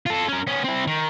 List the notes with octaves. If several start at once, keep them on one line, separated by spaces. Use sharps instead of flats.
F4 A4
C#4 A#4
B3 C#4
C4 E4
D#3